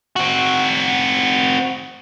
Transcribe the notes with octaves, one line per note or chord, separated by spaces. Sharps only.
C4 F#4